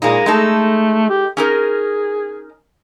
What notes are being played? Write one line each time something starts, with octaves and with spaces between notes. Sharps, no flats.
A#2 G#3 A#3 D#4
G#3 A3 D#4 A4
G4
C#4 D#4 G#4 A#4